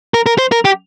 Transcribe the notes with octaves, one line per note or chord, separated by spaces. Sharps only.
A#4
A#4
C5
A#4
G4